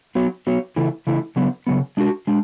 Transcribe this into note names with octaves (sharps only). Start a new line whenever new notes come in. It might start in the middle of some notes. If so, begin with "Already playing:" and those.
F#3 B3 F#4 C#5
F#3 B3 F#4 C#5
C#3 E3 A3 E4
C#3 E3 A3 E4
C#3 F#3 B3
C#3 F#3 B3
G#3 D4 F#4
G#3 D4